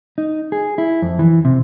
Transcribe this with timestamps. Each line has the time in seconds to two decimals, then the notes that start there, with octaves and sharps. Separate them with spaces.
0.18 D#4
0.52 G#4
0.78 E4
1.02 F2
1.19 E3
1.45 C3